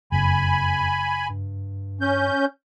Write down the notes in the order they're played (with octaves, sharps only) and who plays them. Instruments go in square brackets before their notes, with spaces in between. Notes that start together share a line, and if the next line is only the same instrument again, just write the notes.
[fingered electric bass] F#1 [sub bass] F2 [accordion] G#5 B5
[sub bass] G2
[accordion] C#4 G6